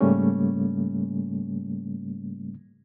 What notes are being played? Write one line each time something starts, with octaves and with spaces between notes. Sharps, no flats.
G#2 C#3 G3 A3 A#3 C#4